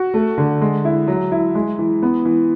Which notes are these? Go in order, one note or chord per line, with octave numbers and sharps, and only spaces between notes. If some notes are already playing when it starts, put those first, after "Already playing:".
Already playing: F#4
A3
D3
G#3
E4
F#3
E4
G#3
E3
B3
E3